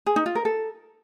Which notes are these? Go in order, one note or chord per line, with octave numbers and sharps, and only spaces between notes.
G#4
D#4
F4
A#4
A4